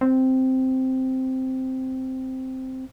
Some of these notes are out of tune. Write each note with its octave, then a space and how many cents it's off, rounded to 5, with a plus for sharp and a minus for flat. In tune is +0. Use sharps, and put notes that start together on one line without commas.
C4 -5